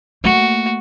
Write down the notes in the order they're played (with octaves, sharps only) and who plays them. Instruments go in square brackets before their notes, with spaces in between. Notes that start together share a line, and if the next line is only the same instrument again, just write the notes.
[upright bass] A3 A#3 [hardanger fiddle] F#4